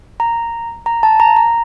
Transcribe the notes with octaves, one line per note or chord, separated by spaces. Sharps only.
A#5
A#5
A5
A#5
A#5